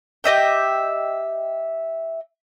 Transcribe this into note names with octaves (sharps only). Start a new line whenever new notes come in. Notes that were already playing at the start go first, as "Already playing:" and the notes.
G4 D#5 E5 G5